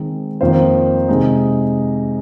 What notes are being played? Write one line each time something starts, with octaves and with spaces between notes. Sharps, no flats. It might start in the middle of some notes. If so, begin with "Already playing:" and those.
Already playing: D#3 G#3 C4 D#4
F2 D#3 A#3 F4 C5
C3 G#3 D#4